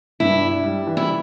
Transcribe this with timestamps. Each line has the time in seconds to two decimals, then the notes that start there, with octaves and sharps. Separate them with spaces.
0.20 G2 E4
0.42 D4
0.64 G3
0.87 E3
0.97 E4